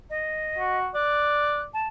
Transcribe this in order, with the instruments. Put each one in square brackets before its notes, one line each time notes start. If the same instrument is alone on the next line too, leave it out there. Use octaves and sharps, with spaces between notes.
[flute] D#5
[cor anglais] F#4
[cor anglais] D5 [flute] F#6
[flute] A5